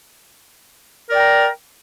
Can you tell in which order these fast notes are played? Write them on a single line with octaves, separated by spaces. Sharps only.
A#4 D5 G5 A#5